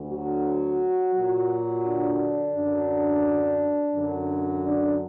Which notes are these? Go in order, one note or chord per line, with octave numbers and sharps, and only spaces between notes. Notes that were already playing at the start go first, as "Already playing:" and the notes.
Already playing: D2 D3
F#3 F#4
A#2 F#3
D3 D4
F#2 D3 F#3
F#2 D3 F#3
D3 D4